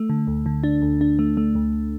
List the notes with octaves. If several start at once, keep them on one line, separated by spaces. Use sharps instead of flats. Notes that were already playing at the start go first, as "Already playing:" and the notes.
Already playing: A3
D3
D2
D3
D4
D2
D4
A3
A3
D2